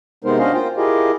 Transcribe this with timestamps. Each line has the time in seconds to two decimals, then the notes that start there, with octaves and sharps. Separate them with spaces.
0.24 C3 G#3 B3 D#4 A#4 C5
0.39 C#4 D4 F#4 C5 D#5 F5
0.54 A#3 F4 C5 G5
0.77 E4 F4 G4 G#4 A#4 D#5